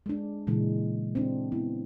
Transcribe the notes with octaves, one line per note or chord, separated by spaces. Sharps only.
G#3 D4
A#2 C#3 E3 G#3
C4 D4
B3 E4